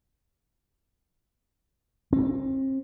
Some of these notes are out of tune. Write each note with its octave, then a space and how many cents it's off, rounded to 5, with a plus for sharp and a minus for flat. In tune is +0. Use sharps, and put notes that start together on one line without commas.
C4 +35